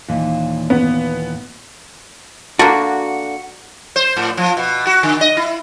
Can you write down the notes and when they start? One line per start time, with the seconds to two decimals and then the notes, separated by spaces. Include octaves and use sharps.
0.08 D#2 A#2 E3
0.70 B3
2.59 D3 A#3 F#4
3.96 C5
4.17 A2
4.37 F3
4.57 B2
4.87 F#4
5.03 D3
5.21 D#5
5.37 E4